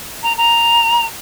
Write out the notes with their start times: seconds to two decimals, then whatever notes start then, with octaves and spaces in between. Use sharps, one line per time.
0.23 A#5
0.37 A#5